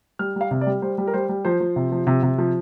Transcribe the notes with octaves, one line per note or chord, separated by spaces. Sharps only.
G3 F6
G3 F5
C3
D5
G3
G3 C5
G3
A#4
G3 C5
G3
F3 C5
F3
C3
F3
C3
C3
F3